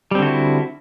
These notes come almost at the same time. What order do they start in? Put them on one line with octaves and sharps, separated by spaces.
G3 C4 D3 F#4 E4